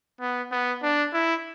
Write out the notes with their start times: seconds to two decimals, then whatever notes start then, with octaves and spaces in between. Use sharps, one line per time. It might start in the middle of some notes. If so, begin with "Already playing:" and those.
0.20 B3
0.51 B3
0.82 D4
1.13 E4